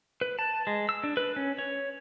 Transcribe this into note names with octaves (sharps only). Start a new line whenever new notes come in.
B4
A5
G#3
E6
D4
B4
C#4
C#5